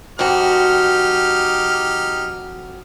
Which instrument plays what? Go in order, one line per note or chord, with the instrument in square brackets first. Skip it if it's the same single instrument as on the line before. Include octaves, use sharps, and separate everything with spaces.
[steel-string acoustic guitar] F2 F#4 [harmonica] D#4 G4 F6